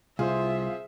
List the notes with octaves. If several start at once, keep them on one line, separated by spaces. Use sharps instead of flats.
C2 F4 G#4 C5 E5